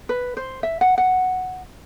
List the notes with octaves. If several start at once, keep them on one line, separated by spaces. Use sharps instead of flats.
B4
C5
E5
F#5
F#5